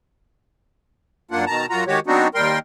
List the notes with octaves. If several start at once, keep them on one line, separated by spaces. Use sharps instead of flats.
F#2 A#3 D4 F4 F#5
B2 D#3 A5 A#5
F#2 F4 F#4 A#5
D#3 G#3 F#4 G4 C#5
F#3 B3 C4 D4 D#4 F#4
D#2 G3 A#4 G5 C6